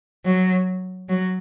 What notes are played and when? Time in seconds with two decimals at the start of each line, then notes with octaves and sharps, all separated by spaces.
0.25 F#3
1.09 F#3